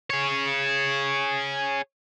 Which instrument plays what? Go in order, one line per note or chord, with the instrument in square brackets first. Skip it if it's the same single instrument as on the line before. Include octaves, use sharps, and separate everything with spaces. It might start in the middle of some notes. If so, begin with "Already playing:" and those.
[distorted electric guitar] G#4 C#5